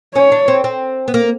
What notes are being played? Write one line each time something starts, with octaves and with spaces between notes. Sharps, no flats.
C#4 C#5
D4
C4
C4
B3
A#3